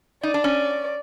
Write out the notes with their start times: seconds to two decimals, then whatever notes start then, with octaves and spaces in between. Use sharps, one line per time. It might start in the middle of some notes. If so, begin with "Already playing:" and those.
0.23 D#4 D5
0.34 D4
0.44 C#4